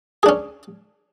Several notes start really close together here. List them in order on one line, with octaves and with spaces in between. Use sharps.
G#4 D4 C#4